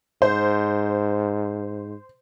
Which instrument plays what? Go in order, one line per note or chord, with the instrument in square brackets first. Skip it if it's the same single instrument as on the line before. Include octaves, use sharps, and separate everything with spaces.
[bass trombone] G#2 [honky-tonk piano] C5